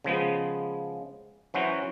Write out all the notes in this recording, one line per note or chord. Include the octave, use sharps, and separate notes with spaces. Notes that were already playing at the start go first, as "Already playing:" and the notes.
C#3 F3 G#3 B3
E3 F#3 C#4 F#4 C5